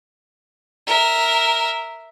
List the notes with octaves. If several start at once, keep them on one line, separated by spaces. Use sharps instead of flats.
A#4 E5